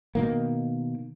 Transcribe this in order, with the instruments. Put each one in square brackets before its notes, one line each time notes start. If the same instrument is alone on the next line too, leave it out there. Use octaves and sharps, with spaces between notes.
[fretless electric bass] B2 D#3 A#3